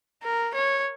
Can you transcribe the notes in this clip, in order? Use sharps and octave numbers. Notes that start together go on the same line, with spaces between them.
A#4
C#5